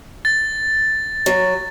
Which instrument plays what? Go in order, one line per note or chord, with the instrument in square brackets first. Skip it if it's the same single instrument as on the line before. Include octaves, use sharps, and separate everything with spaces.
[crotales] A6
[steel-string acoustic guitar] F#3